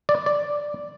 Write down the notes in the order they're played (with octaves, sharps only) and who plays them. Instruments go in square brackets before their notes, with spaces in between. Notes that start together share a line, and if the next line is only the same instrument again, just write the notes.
[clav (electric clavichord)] D5
D5